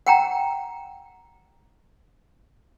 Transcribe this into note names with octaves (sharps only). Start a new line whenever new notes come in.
F#5 G5 A#5